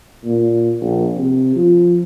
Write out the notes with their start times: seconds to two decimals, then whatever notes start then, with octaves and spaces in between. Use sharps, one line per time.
0.25 A#2
0.81 A#1
1.18 C3
1.56 F3